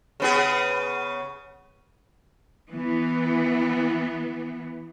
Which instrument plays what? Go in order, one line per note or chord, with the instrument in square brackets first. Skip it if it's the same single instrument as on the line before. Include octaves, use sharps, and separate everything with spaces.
[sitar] C#3 B3 G#4
[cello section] E3 B3